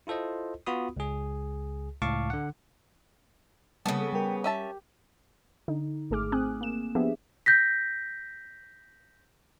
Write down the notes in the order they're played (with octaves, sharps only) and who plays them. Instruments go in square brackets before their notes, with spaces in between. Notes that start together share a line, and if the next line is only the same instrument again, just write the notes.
[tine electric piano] E4 F4 A4 C5 D#5
B3 F4 F#4 B5 D#6
C#2 G#4
C#2 A2 F5 A5 C#6 D6
D3 F#5
[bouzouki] C#3 B3 [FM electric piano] G3 A#3 [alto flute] G#5 [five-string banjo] A5
[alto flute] A4
[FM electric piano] G3 A#4 [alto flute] G5
[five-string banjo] C#4 E5 A5 [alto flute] G4
[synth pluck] D3 D#4
G#1 A3 G#4 D6 F6
C4 G#5 D#6 F#6
A#3 E7
F3 B3 D4 G4 G#4 E5
[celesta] G6 A#6 B6